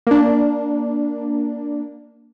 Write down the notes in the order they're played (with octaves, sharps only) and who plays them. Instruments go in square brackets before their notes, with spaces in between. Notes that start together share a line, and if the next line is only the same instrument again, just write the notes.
[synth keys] A#3 D4